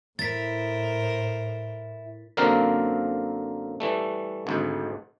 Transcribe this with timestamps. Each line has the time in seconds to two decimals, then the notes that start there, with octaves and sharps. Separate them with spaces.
0.19 A2 E4 A#4 C5 A6 B6
2.37 F#2 D3 A#3 C4 A#4 F5
3.80 E3 G3 A3
4.47 G#1 D2 G#2